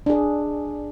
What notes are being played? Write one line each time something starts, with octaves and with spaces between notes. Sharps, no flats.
D4 G#4